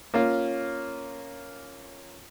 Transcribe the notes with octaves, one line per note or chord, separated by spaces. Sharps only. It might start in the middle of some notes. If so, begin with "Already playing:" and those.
A#3 C#4 F4